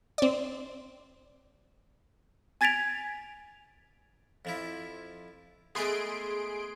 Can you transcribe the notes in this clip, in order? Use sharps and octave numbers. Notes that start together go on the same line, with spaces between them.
C4 D5
G#5 G#6 A6 B6 D7 F7
F2 F3 E4
G#3 A3 B3 G#4 C6 D7